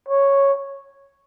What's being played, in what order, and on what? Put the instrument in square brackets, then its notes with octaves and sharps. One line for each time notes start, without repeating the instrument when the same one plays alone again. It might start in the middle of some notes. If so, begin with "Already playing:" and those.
[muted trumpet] C#5